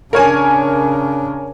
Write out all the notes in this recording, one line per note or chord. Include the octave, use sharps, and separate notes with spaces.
C#3 D4 A#4 C#5 G#5